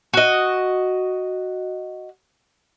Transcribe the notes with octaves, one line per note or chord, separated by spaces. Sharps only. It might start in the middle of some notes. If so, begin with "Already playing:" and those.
F#4 D#5